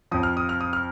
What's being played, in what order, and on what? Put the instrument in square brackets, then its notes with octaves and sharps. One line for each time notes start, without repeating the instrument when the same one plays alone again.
[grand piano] F2 F3 D#6
F6
D#6
F6
D#6
F6